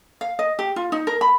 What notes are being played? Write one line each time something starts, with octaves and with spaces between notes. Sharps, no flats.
F5
D#5
G4
F4
D#4
A#4
B5